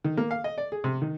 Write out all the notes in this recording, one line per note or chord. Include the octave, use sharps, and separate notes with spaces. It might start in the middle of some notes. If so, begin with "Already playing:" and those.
D#3
A#3
F5
D#5
D5
G#4
C3
D#3